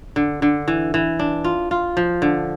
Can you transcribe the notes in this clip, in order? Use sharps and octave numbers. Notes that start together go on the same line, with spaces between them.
D3
D3
E3
E3
D4
F4
F4
F3
D3